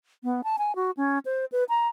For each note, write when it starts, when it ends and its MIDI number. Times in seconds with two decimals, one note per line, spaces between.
0.24 0.41 59
0.44 0.56 81
0.58 0.75 80
0.75 0.91 66
0.97 1.19 61
1.25 1.45 72
1.52 1.64 71
1.69 1.87 82